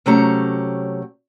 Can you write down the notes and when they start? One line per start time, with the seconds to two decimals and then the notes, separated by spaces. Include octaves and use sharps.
0.06 C3 F#3 A3 C#4 G4 A#5